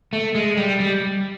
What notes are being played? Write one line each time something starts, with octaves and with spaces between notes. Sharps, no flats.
A3
G#3
G3
G3